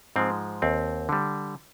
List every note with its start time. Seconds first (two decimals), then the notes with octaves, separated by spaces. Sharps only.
0.16 G#2 F3 G#3 C4
0.62 D#2 C4
1.09 D3 G3